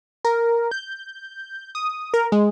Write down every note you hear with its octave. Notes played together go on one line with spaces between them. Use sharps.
A#4
G6
D#6
A#4
G#3